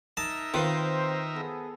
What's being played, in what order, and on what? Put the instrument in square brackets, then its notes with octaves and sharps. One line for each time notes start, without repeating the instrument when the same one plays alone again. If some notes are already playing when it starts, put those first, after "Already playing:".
[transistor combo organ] D#4 A#4 E5 [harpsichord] A5
[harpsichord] D#3 [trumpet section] C4 C5 [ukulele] F4 B4 F5
[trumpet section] B3 G#4 A4